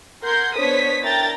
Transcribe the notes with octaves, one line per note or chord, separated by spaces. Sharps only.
A#4 F#5 C6 G6 G#6
B3 D4 C5 C#5 D#6 B6
D4 E4 A#4 G5 A#5 A6